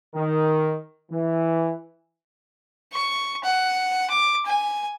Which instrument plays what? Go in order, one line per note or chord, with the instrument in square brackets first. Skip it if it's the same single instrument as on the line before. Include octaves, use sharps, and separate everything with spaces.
[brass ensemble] D#3
E3
[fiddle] C#6
F#5
D6
G#5